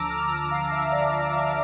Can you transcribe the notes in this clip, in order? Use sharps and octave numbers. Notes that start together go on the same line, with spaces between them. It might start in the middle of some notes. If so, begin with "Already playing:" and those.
Already playing: D2 D3 F3 A5 A#5 D6 E6
F6
E6
F5
E5
D5
E5